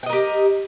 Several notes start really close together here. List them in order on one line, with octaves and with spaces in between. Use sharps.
G5 D#5 A#4 G4